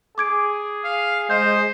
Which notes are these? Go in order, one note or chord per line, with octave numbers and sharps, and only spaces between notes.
G#4 D6 G#6 D7
F5
G#3 C5 D#5 G6